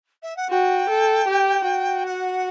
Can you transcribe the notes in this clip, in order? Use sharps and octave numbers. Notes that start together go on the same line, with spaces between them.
E5
F#5
F#4 G5
A4
G4
F#4
F#5